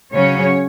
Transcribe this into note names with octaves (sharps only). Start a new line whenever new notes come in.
C#3 F#3 C#4 C#5